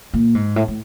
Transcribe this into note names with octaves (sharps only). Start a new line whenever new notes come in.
A#2
G#2
A2
A2